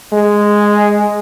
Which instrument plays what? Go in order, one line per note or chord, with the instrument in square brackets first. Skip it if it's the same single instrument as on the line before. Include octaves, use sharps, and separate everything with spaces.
[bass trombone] G#3